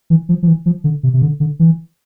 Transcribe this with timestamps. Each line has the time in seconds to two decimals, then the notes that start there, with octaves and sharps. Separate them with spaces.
0.10 E3
0.29 F3
0.43 F3
0.47 E3
0.66 F3
0.84 D3
1.03 C3
1.14 C3
1.22 D3
1.40 D3
1.59 E3